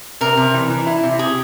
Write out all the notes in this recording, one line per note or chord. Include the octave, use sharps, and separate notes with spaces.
C3 A#4
C3
E3
E3
E4
C3
G4 G#4